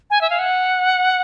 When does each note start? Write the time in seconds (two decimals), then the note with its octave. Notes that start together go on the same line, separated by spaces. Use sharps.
0.10 G#5
0.21 E5
0.30 F5
0.39 F#5